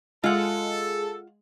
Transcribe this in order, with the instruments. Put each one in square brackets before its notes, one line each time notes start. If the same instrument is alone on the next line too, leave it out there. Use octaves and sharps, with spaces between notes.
[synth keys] G#3 [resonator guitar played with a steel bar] F4 F#5 [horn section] A4